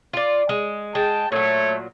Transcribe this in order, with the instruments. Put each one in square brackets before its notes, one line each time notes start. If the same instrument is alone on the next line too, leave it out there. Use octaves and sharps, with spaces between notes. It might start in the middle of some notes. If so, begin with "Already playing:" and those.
[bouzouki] F4 D5
G#3
[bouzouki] G#3 [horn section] G5 A5
[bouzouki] A#2 F#3 [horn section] A3 C#5